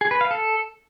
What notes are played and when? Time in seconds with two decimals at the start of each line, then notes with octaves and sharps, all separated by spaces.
0.01 G#4
0.11 B4
0.21 F5
0.31 A4